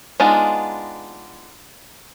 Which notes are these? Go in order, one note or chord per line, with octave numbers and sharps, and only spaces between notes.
G#3 B3 D4 D#4 F4